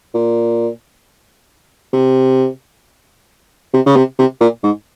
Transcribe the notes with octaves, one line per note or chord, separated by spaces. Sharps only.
A#2
C3
C3
C#3
C3
C3
A#2
G#2